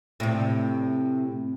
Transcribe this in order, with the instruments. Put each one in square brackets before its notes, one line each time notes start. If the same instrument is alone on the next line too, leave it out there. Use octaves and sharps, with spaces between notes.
[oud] A2 C3